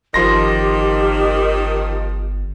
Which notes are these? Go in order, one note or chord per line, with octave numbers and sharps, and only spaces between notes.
G1 D#3 F3 G4 C6 A#6